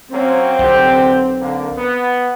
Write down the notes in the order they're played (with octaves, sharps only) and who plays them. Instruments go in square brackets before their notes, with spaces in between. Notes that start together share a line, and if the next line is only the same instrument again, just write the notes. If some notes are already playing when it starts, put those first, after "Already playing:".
[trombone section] F#3 A#3 C#4 [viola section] C4
[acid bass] B1 [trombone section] D3 G4 C5
[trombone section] D3 A#3
B3